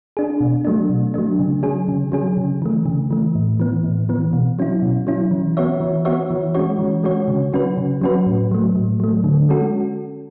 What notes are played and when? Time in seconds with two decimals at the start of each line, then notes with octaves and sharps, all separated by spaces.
0.17 D4 G#4
0.40 B2
0.65 F#3 A3 D4
0.90 B2
1.14 F#3 A3 D4
1.39 C#3
1.63 F#3 C#4 G#4
1.88 C#3
2.12 F#3 C#4 G#4
2.37 C#3
2.62 E3 A3
2.86 C#3
3.11 E3 A3
3.35 A2
3.60 E3 B3
3.84 A2
4.09 E3 B3
4.33 B2
4.59 F#3 C#4 E4
4.82 B2
5.07 F#3 C#4 E4
5.31 E3
5.57 B3 F#4 C#5 E5
5.80 E3
6.05 B3 F#4 C#5 E5
6.31 E3
6.55 G#3 C#4 F#4 C#5
6.79 E3
7.04 G#3 C#4 F#4 C#5
7.28 C#3
7.53 F#3 C#4 F#4 B4
7.77 C#3
8.01 F#3 C#4 F#4 B4
8.27 A2
8.51 F#3 A3
8.75 A2
9.00 F#3 A3
9.24 D3
9.49 G#3 C#4 F#4 A4